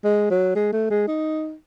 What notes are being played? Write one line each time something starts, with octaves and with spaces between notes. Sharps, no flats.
G#3
F#3
G#3
A3
G#3
D#4